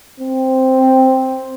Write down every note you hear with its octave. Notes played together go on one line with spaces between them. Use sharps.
C4